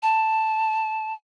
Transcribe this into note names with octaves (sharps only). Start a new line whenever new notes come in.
A5